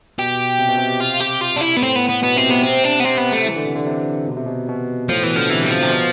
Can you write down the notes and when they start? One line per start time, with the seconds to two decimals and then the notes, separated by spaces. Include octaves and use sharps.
0.18 B2 G4
0.59 C3
0.68 B2
0.77 C3
1.00 F4
1.20 G4
1.41 F4
1.56 D4
1.61 E4
1.77 B3
1.82 A2 C4
1.96 B3
2.09 B3
2.22 B2 B3
2.36 C3 C4
2.49 C3 B3
2.63 C4
2.84 D4
3.00 B3
3.04 C3 C4
3.18 B3
3.32 A3
3.45 E3
3.56 D3
3.66 C3
3.75 D3
3.86 C3
4.27 B2
4.37 C3
4.46 B2
4.68 B2
5.09 A2 F3
5.23 B2 E3
5.36 D3 F3
5.50 C3 E3
5.63 G3
5.71 F3
5.83 C3
5.90 B2